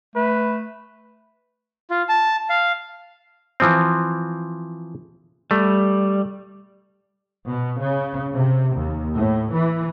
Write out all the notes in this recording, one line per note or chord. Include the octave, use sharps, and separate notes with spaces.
A3 B4
F4
A5
F5
E3 F3 C4
G3 A3
B2
C#3
C3
D#2
A2
E3